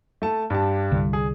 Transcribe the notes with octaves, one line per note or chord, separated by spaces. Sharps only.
A3 A5
G2 G4 A5
C2 D3 G3
G#4